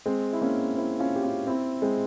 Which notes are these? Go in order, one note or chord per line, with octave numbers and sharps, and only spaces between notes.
G#3 C4
E4
A#3 C#4
C4 E4
C#4 F4
G4
C#4 F4
C4 E4
G#3 C4